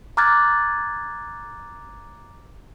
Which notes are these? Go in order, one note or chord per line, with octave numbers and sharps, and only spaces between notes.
A#5 D6 F6 F#6 G#6 A6